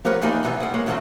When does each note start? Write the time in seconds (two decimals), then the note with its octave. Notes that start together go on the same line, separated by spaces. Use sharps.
0.05 F3 B3 G4 A#4 B4 C#5
0.22 E2 G3 A#3 D#4 G#5 C6
0.43 D#2 C3 E3 G3 B3
0.60 G3 G#4 F#5
0.74 G#3 A#3 B3 C5 C#5
0.86 G#2 C#3 E3 F#3 A5 C6